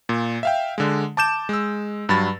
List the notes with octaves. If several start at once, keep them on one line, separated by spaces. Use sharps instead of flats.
A#2
E5 F5 G5
D3 G#3
A5 D6 G6 E7
G#3 E6
G2 F#3 B5 A6